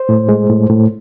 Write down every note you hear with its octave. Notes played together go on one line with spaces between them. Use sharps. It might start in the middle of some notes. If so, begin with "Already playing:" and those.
Already playing: C5
A2
G#3
A2
A2